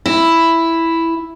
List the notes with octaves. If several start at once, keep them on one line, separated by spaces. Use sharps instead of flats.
E4